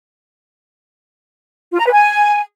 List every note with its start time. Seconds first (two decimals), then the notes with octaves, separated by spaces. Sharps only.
1.72 F4
1.79 A#5
1.86 B4
1.92 G#5